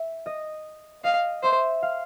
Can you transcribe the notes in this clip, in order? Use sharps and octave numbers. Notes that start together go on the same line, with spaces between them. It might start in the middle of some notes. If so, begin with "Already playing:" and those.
Already playing: E5
D#5
D#5 F5
C5 E5
F5